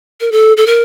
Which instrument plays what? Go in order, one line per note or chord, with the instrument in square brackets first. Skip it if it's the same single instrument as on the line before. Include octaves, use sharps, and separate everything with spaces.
[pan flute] A#4
A4
A4
A#4